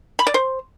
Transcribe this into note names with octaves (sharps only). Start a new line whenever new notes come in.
B5
D5
C5